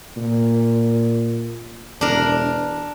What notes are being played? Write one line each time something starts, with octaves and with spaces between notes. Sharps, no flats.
A#2
E1 D4 A#4